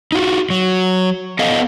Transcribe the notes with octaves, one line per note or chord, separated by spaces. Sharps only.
D#4 F4 F#4
F#3
B3 A4 D#5 F5